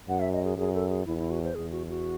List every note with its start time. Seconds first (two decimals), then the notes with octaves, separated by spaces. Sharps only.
0.08 F#2 F#5
0.20 E5
0.33 D#5
0.44 G#4
0.57 F#2 G#4
0.74 A4
0.89 G#4
1.06 E2 E4
1.18 E4
1.30 F#4
1.43 C5
1.55 E2 G#4
1.71 F#4
1.89 F#4